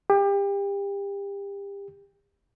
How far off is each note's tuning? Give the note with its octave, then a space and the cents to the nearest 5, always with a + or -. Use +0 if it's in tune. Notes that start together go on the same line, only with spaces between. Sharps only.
G4 +30